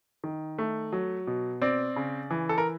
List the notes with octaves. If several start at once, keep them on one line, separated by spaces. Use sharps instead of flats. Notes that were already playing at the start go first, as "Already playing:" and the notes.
D#3
A3
F#3
B2
C4 D5
C#3
E3
A4
A#4